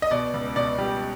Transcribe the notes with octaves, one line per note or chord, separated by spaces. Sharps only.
D#5
B2 D5
C#2
B2 D5
G3